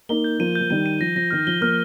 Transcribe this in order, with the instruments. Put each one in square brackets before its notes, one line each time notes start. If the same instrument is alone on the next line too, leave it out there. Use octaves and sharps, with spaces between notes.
[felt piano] A#3 D#4 [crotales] G7
[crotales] G6
[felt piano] F3 A#3 [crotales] D#7
[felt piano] F3 [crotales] G6
[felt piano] D#3 G3 [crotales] D#7
[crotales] D#7
[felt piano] F3 [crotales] A#6
[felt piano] F3 [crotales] A#6
[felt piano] D#3 [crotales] F6
[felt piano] F3 [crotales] G7
[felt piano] F3 A#3 [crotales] F6